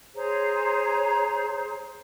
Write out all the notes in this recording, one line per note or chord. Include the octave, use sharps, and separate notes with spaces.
G#4 C5 C#5 A#5